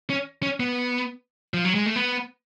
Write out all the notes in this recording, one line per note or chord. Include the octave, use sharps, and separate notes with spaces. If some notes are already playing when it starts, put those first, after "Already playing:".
C#4
C#4
B3
F3
F#3
G#3
A3
B3